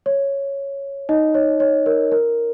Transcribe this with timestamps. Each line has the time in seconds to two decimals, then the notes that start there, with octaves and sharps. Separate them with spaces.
0.06 C#5
1.09 D#4 D#5
1.34 C#5
1.60 C#5
1.86 A#4
2.12 A#4